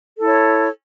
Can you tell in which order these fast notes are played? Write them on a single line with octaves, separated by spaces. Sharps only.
A4 E4 C#5